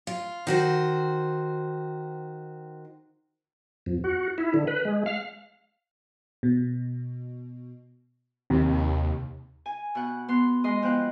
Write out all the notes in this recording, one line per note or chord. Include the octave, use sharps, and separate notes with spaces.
F4
D#3 F#4 C5
F2
F#4
E4
D3
B4
G#3
F5
B2
D#2 C3
G#5
B2 F#5
B3 C6
G#3 D#5 C6
F3 B3 C5 G5 F#6